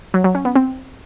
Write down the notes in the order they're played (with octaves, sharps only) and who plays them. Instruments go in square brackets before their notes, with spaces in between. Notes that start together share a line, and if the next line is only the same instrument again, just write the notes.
[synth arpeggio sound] F#3
F#3
C#4
B3
C4